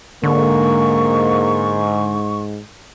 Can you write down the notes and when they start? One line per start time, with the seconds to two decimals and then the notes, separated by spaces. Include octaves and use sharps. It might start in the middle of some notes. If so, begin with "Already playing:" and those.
0.24 G#2 D3 A#3 C#6